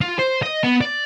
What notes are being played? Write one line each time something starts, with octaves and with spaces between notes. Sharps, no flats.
F4
C5
D#5
B3
D5